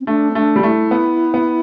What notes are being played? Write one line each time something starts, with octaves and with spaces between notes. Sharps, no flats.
C4
A3 D4
C4
A3 D4
G3 F4
A3 E4
B3
B3